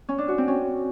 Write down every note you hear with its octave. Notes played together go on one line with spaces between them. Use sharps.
C#4
D4
F#4
C4
C#4